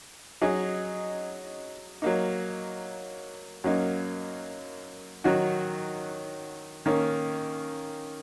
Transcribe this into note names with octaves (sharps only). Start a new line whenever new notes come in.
F#3 D#4 G#4 D#5
F#3 A#3 D#4
F#2 F#3 A#3 D#4
D#3 F#3 D#4 F#4
D#3 A#3 C#4